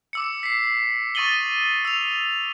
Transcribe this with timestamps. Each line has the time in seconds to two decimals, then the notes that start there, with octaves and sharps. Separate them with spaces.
0.13 D6 E6 C#7
0.43 B6 C7
1.15 C#6 D#6 A6 D#7 F#7 G7
1.85 E6 F7